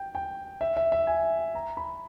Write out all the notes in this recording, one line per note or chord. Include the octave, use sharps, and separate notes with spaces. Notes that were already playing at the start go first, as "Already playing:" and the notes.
Already playing: G5
G5
E5
E5
E5
G#5
A#5
B5